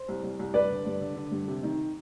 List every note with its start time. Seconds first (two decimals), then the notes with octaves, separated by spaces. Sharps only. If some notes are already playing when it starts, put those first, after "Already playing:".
Already playing: C5
0.08 C2
0.24 C2
0.39 C2
0.54 G2 B4 D5
0.70 D3
0.86 G2
1.01 D3
1.16 D3
1.31 G2
1.48 C3
1.63 D#3